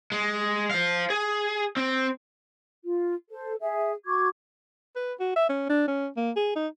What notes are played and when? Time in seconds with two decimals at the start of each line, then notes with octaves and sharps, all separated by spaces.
0.12 G#3
0.71 C5 F5
1.10 G#4
1.77 C4
2.84 F4
3.30 A4 C5
3.60 G#4 E5
4.06 F#4 C#6 D6 G#6
4.96 B4
5.20 F#4
5.36 E5
5.49 C#4
5.70 D4
5.88 C#4
6.17 A#3
6.36 G#4
6.56 D#4